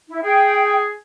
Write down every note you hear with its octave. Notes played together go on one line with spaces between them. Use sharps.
E4
G#4 G5